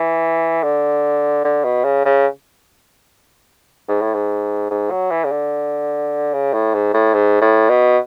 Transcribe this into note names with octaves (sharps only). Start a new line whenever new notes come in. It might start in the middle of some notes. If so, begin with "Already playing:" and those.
Already playing: E3
D3
D3
B2
C#3
C#3
G#2
A2
G#2
G#2
F#3
E3
C#3
D3
C#3
A2
G#2
A2
G#2
A2
B2